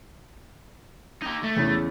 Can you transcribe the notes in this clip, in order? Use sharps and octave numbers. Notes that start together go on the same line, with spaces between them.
D#4 G4
A3
E2 C#3 E3